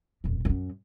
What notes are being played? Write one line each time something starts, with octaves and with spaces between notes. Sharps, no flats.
D#1 F2
F#2 C#4